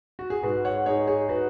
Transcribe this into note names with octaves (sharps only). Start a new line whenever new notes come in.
F#4
G#4
G#2 F#4 B4
C#5 F#5
D#4 G#4 C#5
G#4 C#5
F#4 B4